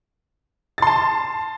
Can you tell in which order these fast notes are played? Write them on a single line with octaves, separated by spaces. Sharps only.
A6 C6 A5